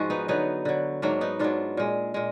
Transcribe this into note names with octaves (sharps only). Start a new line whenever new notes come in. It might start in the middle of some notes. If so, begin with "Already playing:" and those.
Already playing: G#2 F3 G#3 F#4 G#4
B3 D#4
D3 F#3 B3 D#4
D3 F#3
G#2 F#3 A#3 D4
B3 D#4
G#2 F#3 D4 F4
A#2 G#3
A#2 G#3